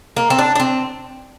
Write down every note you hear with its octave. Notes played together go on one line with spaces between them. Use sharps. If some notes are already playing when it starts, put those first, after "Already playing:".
A#3
C4
D4
D4
C4